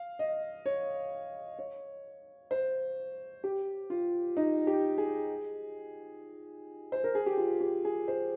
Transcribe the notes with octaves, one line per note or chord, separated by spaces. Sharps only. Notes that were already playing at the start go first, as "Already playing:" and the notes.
Already playing: F5
D#5
C#5
C#5
C5
G4
F4
D#4
G4
G#4
C5
A#4
G#4
G4
F4
G4
G#4
C5